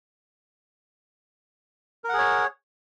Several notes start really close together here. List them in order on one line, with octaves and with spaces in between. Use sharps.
A#4 F#5 G#4 C#5